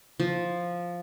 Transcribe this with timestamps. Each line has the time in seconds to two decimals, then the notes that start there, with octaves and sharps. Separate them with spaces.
0.20 F3